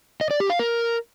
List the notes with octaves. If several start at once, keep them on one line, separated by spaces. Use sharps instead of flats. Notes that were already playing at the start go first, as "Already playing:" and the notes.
D#5
D5
G4
F5
A#4